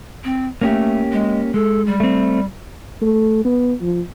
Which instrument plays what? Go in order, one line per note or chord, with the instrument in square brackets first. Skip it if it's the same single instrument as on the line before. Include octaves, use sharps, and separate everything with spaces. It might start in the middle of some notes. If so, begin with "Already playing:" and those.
[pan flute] C4
[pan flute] A3 [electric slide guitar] A#3 C#4 G4
[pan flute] G#3
[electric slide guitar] G#3 [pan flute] A4
[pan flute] G3
[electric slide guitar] A3 C4
[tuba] A3
B3
F3